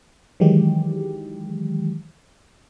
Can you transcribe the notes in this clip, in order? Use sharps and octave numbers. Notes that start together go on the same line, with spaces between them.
D#3 E3 F#3 G#3 G4